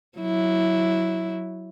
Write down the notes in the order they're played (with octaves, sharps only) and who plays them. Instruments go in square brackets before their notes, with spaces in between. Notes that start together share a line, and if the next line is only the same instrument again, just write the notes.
[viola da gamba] F#3 E4